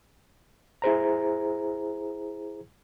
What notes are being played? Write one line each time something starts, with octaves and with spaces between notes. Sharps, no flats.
E4 G#4 C5 A#5